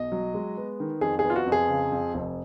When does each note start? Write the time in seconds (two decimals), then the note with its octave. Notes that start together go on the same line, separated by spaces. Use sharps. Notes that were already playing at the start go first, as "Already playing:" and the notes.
Already playing: B1 D#5
0.12 F#3
0.34 G#3
0.57 B3
0.80 D#3
1.01 F2 G#4
1.19 G#4
1.24 B3
1.30 F4
1.36 F#4
1.46 F2
1.52 G#4
1.69 C#3
1.92 F2
2.14 F1